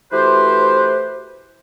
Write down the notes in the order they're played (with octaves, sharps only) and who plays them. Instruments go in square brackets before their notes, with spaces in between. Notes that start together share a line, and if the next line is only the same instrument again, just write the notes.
[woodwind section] E3 A3 F#4 G4 B4 C5